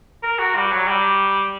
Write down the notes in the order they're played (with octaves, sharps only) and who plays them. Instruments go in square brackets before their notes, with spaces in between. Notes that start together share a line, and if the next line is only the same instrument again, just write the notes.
[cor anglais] A#4
F#4
G3
F#3
G3